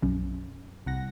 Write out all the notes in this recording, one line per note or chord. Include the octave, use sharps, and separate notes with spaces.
B1 F#2
C2 F#5 A#6